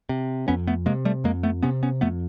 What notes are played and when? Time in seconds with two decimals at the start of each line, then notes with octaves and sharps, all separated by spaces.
0.09 C3
0.48 F2 B3 C#4
0.67 A3 B3
0.86 C3 G#3 A#3
1.05 G3 A3
1.24 F2 G#3 A#3
1.43 A3 B3
1.62 C3 B3 C#4
1.83 B3 C#4
2.01 F2 A3 B3